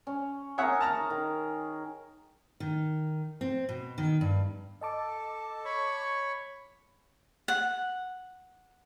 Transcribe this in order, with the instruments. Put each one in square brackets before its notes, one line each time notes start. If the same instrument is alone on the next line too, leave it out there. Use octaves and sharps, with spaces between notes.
[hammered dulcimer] C#4
[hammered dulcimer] G#4 A#4 [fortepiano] C#5 E5 F#5
[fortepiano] A5 A#5 F6
[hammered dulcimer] D#3
[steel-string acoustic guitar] D#3
C4
B2
D#3
G2
[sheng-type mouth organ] A4 [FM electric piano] D#5 A5 D6
[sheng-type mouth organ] C#5 B5 C#6
[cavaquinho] F#5